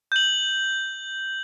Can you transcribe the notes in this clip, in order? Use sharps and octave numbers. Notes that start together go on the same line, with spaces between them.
G6 F#7